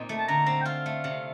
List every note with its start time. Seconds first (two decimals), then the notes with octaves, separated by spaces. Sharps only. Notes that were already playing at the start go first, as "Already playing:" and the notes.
Already playing: A#2 C4 D#4
0.09 A3
0.17 A5
0.28 D3 A#5
0.46 C4 A#5
0.61 G5
0.65 F4 F5
0.86 A3
1.04 C3